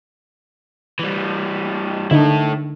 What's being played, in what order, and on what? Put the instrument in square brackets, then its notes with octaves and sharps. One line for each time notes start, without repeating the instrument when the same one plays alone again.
[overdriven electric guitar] E3 G3
[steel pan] D3 D#4 [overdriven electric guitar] E4 A4